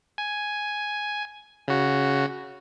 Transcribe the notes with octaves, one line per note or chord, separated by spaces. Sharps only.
G#5
C#3 F#4